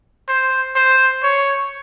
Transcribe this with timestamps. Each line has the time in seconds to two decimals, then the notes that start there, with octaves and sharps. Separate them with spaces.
0.29 C5
0.76 C5
1.24 C#5